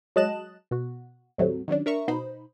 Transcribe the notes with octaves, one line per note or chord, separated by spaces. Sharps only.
F#3 G#3 D#5 A5 F#6 E7
B2 F#4
D#2 A2 F#3 G3 A3 C4
D#3 F#3 C#4 D4
D4 A#4 E5 A#5 C#6
B2 D#4 C5 B5